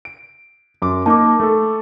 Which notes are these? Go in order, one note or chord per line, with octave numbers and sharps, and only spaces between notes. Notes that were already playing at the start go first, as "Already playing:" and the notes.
D7
F#2 D6
A#3 D#4 A5 D6
A3 A4